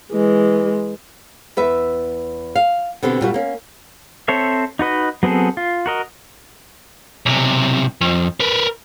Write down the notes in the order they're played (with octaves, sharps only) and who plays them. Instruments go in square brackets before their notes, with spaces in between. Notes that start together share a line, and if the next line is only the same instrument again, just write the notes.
[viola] E3 G#3
[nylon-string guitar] E2 B4 E5
F5
B2 D3 C4 G4
A#2 G3 F#4
A#3 C#4
[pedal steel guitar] C4 A4 C5 C#5 E5
D#4 F#4 B4 D#5
F#3 B3 C4 G#4 A4
F4
F#4 A#4 D#5
[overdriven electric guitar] B1 C3
F2
A#4 B4